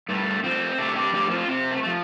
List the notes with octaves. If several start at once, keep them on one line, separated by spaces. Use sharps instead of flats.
G2 A3
F3 A3 C4
C3 A3 D4
D4 G4
F3 A3 D4 G4
C4 F4
C3 C4
A3
A3
F3